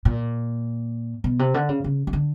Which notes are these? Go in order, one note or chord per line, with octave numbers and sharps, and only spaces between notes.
A#2
B2
C3
D3
C#3
C#3
D#3
D3